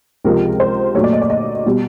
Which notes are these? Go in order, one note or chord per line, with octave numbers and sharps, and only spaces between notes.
C#2 C3 F3 G#3 A#4
C5
A#2 F#3 A3 C#5
D5
D#5
D5
D#5
B2 G3